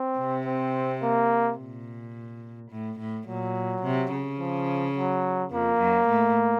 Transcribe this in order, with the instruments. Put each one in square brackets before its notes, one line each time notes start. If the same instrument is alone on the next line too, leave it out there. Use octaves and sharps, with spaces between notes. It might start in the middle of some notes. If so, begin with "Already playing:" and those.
Already playing: [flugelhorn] C4
[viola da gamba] C3
[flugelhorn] C4
A#3
[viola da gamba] A#2
A2
A2
[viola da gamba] A#2 [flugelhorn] F#3
[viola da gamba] C3
C#3
[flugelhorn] F3
F#3
[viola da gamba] F2 F3 [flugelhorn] A#3
[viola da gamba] F#2 F#3
A2 A3